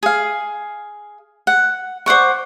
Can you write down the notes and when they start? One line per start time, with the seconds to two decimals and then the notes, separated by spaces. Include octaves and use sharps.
0.03 G#4 F5
1.47 F#5
2.06 C5 D5 F#5 C#6